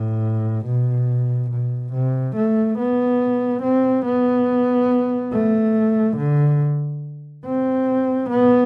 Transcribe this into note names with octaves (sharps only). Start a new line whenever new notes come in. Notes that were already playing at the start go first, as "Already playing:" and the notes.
Already playing: A2
B2
B2
C3
A3
B3
C4
B3
A3
D3
C4
B3